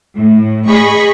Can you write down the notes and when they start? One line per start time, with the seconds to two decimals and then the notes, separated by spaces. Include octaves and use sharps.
0.16 A2
0.68 G#4 D#5 B5 C#6